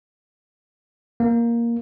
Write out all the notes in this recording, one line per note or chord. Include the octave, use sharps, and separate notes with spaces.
A#3